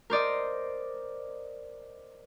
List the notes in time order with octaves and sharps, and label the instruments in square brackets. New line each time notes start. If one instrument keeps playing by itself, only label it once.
[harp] A#4 C5 D5 D#5